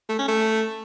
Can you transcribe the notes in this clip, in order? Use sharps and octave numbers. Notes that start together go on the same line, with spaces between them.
A3
C#4
A3